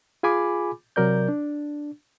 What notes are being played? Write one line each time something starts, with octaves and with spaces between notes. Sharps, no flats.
F4 G#4 G#5 B5 D6
C3 F#3 A#4 D5 G6
D4